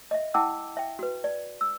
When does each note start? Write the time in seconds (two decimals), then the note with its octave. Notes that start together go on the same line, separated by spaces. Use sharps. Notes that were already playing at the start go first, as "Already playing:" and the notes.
0.11 D#5 E5
0.34 E4 F#5 G5 A5 D6 E6
0.77 E5 G5
0.99 F#4 B4
1.24 D5
1.61 E6